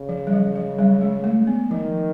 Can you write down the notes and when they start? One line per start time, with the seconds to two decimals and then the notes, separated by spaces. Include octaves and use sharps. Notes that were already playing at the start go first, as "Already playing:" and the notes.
Already playing: C#3
0.09 F3
0.27 G3
0.33 F#3
0.56 F#3
0.79 G3
1.01 G#3
1.24 A3
1.47 B3
1.71 D#3 F3